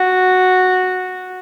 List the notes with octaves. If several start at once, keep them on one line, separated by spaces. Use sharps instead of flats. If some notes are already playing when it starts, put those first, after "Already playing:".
Already playing: F#4